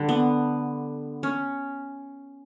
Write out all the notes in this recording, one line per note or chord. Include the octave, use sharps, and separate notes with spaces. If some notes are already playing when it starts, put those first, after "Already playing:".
Already playing: D3 G3
B3
C#4